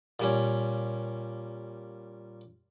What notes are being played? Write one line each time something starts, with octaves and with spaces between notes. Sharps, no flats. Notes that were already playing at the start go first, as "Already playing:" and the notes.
A#2 G3 C#4